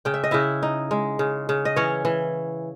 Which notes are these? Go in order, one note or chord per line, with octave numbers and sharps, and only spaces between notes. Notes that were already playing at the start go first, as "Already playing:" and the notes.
C#3 G5
E5
D#5
C#3 E4 E5
D#4
G#3
C#3
C#3
D#5
E3 C#4 C#5
E3